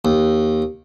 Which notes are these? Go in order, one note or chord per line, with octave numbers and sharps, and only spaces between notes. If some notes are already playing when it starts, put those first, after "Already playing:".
D#2